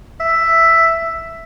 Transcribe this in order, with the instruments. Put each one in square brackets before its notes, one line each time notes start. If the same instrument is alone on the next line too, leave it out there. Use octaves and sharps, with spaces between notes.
[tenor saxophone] E5